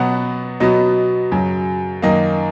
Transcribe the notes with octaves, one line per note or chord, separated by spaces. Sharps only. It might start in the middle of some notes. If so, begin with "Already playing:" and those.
Already playing: B2 F#3 B3 F#5
B2 F#3 B3 D#5
F#2 C#3 F#3
F#2 D#3 A#3 D#5